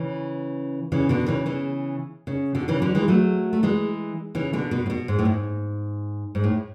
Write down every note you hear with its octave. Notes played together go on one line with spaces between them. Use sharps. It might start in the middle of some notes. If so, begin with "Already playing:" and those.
Already playing: C#3 E3
C#3 E3
B2 D3
C#3 E3
C#3 E3
C#3
B2 D3
C#3 E3
D3 F#3
E3 G#3
F#3 A3
A3
E3 G#3
C#3 E3
B2 D3
B2
A2
B2
G#2
A2
G#2
G#2
A2